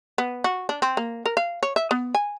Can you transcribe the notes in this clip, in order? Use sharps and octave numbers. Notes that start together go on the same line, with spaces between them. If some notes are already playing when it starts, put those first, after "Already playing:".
B3
F#4
D4
C4
A#3
A#4
F5
C#5
E5
B3
G#5